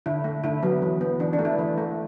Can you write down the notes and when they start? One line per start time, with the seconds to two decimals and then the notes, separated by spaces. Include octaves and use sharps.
0.06 D3 E4
0.24 A3
0.44 D3 E4
0.63 F#3 B3
0.82 E3
1.01 B3
1.20 E3 D4
1.33 D4
1.39 A3
1.45 E4
1.59 E3
1.78 A3